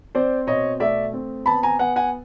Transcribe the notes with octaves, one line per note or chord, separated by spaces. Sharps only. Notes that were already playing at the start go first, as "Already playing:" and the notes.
C4 C5 D5
B2 C#5 D#5
A3 D5 E5
C4
B3 A5 B5
G#5 A#5
B3 F#5 G#5
F#5 G#5